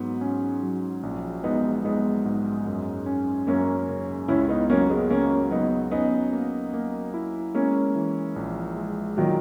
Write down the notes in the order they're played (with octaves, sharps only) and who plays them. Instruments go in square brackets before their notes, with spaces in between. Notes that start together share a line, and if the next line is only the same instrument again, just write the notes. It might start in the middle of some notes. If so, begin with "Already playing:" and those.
Already playing: [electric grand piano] G#2 F#3 [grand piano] B3
[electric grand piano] C#4
F#3
A#1
[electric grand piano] G#3 [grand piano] B3 D#4
[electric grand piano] G#3 [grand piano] B3 D#4
[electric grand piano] G#2
F#2
C#4
[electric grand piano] F#2 [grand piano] A#3 C#4
[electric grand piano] C#3
[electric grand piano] C#2 [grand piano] C#4 E4
[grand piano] B3 D#4
[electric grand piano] F#3 [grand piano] A#3 C#4
[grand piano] G#3 B3
[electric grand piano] C#3 [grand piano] A#3 C#4
[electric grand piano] F#3 [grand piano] B3 D#4
[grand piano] B3 D#4 [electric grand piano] C#4
[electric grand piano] A#3
A#3
E4
[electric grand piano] G#3 [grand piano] A#3 C#4
[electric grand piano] E3
A#1
G#3
[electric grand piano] A#2 [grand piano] D#3 F#3